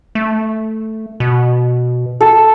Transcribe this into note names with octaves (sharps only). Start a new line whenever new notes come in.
A3
B2
A4